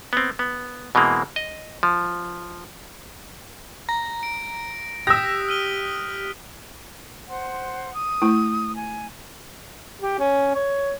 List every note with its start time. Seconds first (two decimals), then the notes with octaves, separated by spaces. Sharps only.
0.13 B3 C4
0.39 B3
0.95 B2 E3 G#3 A#3 C4
1.36 D#5
1.83 F3
3.89 A#5 A#6
4.23 D7
5.07 G4 D#6 E6 F#6 A#6 B6
5.48 F6 D#7 G7
7.28 C5 F#5 C6
7.93 D#6
8.22 A3 E4
8.75 G#5
10.02 G4
10.19 C#4
10.55 C#5